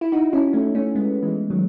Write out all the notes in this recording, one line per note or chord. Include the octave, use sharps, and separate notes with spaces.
E4
D#4 F#4
C#4 E4
A3 C#4
A3 C#4
G#3 B3
E3 G#3
D#3 F#3